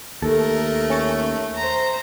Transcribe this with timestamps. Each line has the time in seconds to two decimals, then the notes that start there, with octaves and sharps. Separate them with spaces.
0.22 D#2 A3 A4 A#4
0.90 C#4 C#5 A5
1.55 C5 A#5